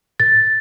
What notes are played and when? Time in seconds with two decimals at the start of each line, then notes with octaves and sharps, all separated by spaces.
0.20 A6